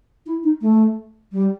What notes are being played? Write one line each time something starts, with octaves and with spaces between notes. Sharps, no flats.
E4
D#4
A3
G3